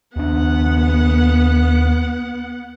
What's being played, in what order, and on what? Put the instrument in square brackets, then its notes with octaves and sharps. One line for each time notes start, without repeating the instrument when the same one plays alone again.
[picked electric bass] D#2 D4 [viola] B3 F#5